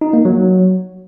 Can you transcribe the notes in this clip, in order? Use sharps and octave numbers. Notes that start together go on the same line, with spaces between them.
D#4
A#3
F#3